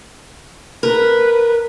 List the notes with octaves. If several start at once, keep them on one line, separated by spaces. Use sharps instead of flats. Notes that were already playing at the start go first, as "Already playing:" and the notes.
A#4 B4